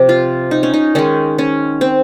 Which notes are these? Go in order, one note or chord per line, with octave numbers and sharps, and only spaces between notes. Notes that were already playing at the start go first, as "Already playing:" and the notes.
Already playing: C3 F3 G4
F4
D#4
C#4
D#4
D#3 G#3 C#4
C#4
C4